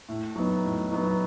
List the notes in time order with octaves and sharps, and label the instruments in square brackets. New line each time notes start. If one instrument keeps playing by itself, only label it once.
[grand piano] A2
F#3 B3 D#4
A2
F#3 B3 D#4